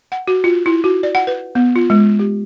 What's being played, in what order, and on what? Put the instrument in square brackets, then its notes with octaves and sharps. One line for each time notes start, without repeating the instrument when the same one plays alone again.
[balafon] F#5
F#4
F4
E4
F#4
D5
F#5
B4
B3
F4
G#3
G4